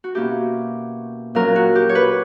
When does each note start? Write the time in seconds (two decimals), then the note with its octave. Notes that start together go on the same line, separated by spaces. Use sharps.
0.04 F#4
0.15 B2 A#3 C#4 E4 G4
1.35 A#2 F#3 C#4 A#4
1.56 F#4
1.75 G4
1.89 C#5
1.95 B4